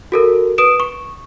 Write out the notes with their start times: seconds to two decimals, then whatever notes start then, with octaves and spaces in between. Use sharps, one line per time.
0.12 F#4 A4 A#4
0.58 B4 D#6 D7 E7
0.80 C#6